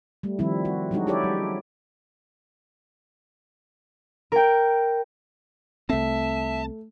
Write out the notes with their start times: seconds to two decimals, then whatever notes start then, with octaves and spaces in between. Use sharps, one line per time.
0.23 G3 A3
0.39 D#3 F3 G3 C4 E4
0.65 F#4
0.91 F#3 G#3 D4 D#4 F#4
1.07 D#4 E4 G4 A4 C#5 D5
1.24 G3
4.32 A#4 G5
5.89 C2 A3 C4 E5 A5